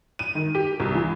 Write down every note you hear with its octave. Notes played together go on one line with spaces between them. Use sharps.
D#7
D#3
G4
C2
E3